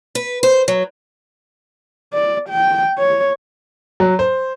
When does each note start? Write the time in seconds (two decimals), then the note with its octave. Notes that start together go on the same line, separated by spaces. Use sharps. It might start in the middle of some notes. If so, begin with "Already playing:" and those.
0.15 B4
0.43 C5
0.68 F#3
2.13 D5
2.49 G5
2.99 C#5
4.00 F#3
4.19 C5